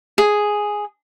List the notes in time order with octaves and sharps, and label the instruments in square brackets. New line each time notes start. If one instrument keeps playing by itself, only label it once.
[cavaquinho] G#4